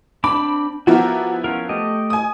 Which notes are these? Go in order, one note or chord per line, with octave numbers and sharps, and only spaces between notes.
C4 D4 B5 D6
F3 B3 E4 F#4 G4 A#4
C#4 F4 A#4
A3 G4 D#5
G#5 D#6